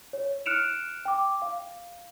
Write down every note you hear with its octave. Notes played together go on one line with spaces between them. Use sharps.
C#5
F6 F#6 C#7 D7 E7 F7
G5 D6
F5